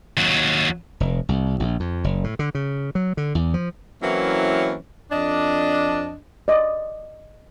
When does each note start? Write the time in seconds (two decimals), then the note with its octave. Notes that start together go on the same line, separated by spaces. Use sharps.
0.17 D#2 F#3
1.00 F1
1.29 C2
1.60 A#1
1.80 F2
2.04 F#1
2.24 A2
2.39 D3
2.55 C#3
2.95 F#3
3.17 D3
3.35 E2
3.54 F3
4.01 E3 F#3 A#3 C4 C#4 E4
5.11 F2 D4 D#5
6.48 D5 D#5